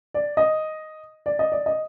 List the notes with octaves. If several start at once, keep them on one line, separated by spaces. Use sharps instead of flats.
D5
D#5
D5
D#5
D5
D#5